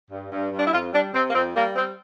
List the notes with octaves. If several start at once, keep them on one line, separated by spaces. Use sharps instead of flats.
G2
G2
G2
D4
E4
F2 F4
G3 D4
C3 C4
A#3
F2 C4
G3 A#3
G3 C4